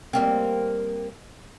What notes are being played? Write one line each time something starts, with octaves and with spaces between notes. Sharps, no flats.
G3 A#3 C4